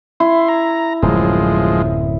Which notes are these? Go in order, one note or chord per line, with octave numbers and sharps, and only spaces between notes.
E4 C6
A#5
D1 F#2 F3 G#3